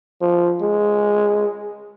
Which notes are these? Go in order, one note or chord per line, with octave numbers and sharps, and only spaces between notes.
F3
G#3